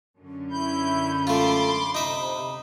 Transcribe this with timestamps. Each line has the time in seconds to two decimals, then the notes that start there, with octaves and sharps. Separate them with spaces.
0.17 F#2 D3 C#4
0.51 E4 B5 G6
1.27 A3 F4 C6 D6
1.95 C3 D#4 E5